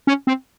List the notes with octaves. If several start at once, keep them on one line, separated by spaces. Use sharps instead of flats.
C#4
C4